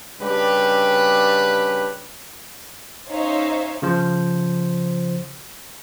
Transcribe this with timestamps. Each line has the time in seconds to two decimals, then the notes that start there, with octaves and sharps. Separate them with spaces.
0.21 C#3 G3 D4 G4 B4
3.09 C#4 D#4 C5 C#5 E5 F5
3.82 C#3 F3 C5